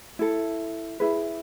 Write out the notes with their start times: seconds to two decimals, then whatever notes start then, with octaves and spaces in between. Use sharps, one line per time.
0.19 E4 A4
1.00 E4 G#4 B4